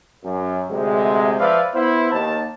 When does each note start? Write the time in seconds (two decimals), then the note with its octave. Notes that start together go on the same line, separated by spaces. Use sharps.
0.24 F#2
0.70 D2 C3 G#3
1.39 F3 B4 D5 E5 F5
1.74 B3 E4 C5
2.12 D#2 A5